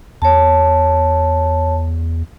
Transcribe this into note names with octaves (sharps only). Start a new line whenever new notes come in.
E2 C#5 A5